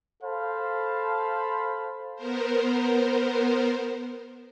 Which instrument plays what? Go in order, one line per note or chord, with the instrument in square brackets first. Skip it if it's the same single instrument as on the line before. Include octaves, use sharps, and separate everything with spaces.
[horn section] A4 C5 F5 A5 B5
[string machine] B3 A#4 C5